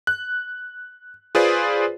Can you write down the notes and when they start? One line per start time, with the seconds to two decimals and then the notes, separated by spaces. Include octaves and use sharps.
0.07 F#6
1.35 F4 G#4 B4 C5 D5